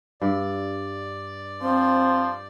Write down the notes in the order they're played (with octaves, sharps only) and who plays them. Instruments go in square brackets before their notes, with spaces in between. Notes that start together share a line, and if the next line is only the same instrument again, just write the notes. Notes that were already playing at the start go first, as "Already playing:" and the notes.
[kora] G2 [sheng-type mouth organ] D5
[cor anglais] F3 [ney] C4